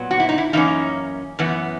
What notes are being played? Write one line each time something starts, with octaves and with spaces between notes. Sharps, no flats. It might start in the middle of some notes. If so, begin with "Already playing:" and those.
Already playing: A#2 F#3 B3
F#4
E4
D#4
E4
F#2 E3 A#3 C#4 D#4
F#2 E3 B3